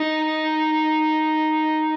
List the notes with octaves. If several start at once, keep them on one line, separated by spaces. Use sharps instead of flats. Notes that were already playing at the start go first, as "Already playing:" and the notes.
Already playing: D#4